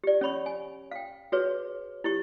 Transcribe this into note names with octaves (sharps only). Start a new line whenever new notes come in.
G4 D5
C#4 C#5 B5 C#6
G#5
F5 G5
F#4 G#4 B4 C#5
E4 G4 C#6